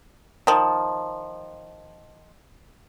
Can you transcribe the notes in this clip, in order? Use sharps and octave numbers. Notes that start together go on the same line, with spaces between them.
D#3 F3